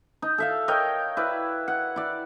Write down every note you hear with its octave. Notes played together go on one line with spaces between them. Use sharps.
D#4
A4 E5 F5
A#4 C#5 D#5 G5
E4 B4 D5
F#5
E4 D5